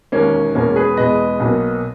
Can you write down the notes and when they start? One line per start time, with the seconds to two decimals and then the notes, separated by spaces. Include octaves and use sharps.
0.12 E1 D#2 D#3 A#3 C#4
0.55 E2 B2 G#3 A#3 C#4
0.76 G#4 B4
0.97 E2 B2 G#3 B4 D#5
1.40 B1 B2 A#3